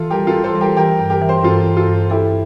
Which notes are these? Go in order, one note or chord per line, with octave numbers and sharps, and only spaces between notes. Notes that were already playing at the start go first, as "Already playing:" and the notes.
Already playing: E3 F4 A4
G3 G4 A#4
F4 A4
E3
A4 C5
G3
G4 A#4
E3 G4 A#4
G2
G4 A#4
E3
C5
A#4
G2 F4 A4
G2
F4 A4
G2
E4 G4 A4